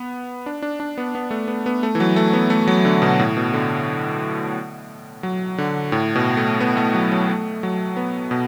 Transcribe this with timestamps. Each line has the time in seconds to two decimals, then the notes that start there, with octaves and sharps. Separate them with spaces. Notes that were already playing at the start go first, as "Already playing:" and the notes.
Already playing: B3
0.46 D4
0.62 D4
0.80 D4
0.98 B3
1.15 B3
1.31 A3
1.48 B3
1.66 B3
1.83 A3
1.95 E3
2.00 F#3
2.16 A3
2.33 B3
2.50 A3
2.68 F#3
2.85 D3
3.02 B2
3.19 A2
3.37 B2
3.54 D3
5.23 F#3
5.58 D3
5.92 A2
6.15 B2
6.37 A3
6.61 B3
6.77 A3
6.94 F#3
7.12 F#3
7.29 A3
7.63 F#3
7.97 B3
8.31 B2